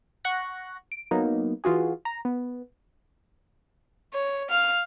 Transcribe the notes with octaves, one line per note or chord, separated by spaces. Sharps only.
F#5 C#6 F#6 A#6
D7
F#3 A#3 B3 D#4
E3 F4 F#4 G#4
A#5
B3
C#5
F5 F6